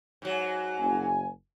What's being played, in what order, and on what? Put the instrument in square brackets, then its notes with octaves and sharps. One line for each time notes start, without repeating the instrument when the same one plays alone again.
[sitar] G#2 F#3
[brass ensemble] F#1 G#5